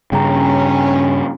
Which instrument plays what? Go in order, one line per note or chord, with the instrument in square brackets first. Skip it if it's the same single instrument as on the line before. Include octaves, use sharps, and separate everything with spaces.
[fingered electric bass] G2 C#3 [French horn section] C#4 [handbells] G5 A#5